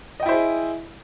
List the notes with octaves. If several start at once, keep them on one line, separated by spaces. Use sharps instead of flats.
E4 G#4 C5 D#5 G5